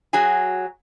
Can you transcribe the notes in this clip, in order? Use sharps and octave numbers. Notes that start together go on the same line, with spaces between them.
F#3 F#4 G#4 G#5